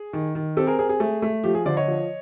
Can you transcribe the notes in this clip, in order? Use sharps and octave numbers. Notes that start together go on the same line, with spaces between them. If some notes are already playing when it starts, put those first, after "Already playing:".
Already playing: G#4
D#3
D#3
C4 G4 A4
G#4 A#4
C4 G#4 A#4
G#4
A3
A3
F3 G4
G#4
D3 C5 D5
C#5 D#5
F3